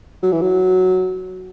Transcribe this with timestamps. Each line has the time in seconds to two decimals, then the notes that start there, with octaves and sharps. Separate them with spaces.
0.23 F#3
0.32 E3
0.42 F#3